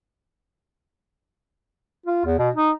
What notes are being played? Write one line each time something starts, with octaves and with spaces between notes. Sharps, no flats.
F4
E2
B2
D#4